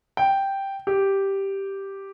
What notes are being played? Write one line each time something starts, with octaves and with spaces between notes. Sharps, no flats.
G5
G4